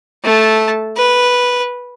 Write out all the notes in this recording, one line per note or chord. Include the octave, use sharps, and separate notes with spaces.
A3 A5
B4